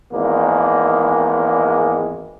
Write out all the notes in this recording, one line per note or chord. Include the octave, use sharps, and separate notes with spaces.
G#1 E2 D#3 G#3 A#3